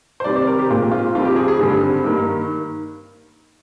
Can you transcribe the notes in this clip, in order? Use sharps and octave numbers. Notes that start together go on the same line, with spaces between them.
C5
C3 D#3 G3 C4 D5
D5
A#4
G4
A#2 G#3 C4 F4
F4
F2 D#3 G3 C4 F4
G4
G#4
G#4
G2 D3 G3 C4
G2 D#3 A#3